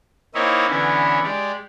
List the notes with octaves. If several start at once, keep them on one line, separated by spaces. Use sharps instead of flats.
A#3 C4 D#4 E4 C#5 D#5
D3 E3 B3 C#4 E4
G#3 G4 D5